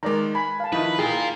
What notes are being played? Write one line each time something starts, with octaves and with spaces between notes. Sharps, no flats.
D#3 G#3 A#4 D5 A#5
G#5 B5
F5 A5
D#3 F3 D#4 E4 B4 D#6
F4 G#4 A#4 G5